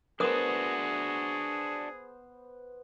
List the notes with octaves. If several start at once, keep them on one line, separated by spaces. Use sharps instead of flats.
B3 D4 F#4 G#4 A#4 C5 D#6